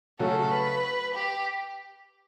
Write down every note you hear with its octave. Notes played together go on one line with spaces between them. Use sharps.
C#3 F#3 A3 C#4 F#4 A4
B4
G4